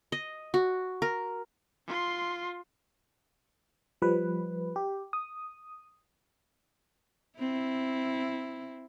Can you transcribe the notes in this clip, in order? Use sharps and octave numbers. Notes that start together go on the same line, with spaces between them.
D#5
F#4
A#4
F4 C6
F3 G3 B4
G4
D#6
C4 E4